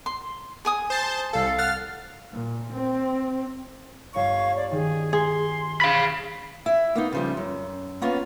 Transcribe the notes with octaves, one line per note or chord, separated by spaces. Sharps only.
C6
G#4 G#5 D#6
C5 A5
C2 A4 F5
F#5 F6 A6
A#2
C4
G1 C#5 F5 B5 C#6 C#7
C#5 D5
D#3 G#4
G#4 C6
F5 B5
E4 E5
A#3 B3 D#4
C#3 F3 G3
F#2
A#3 B3 C#4 F4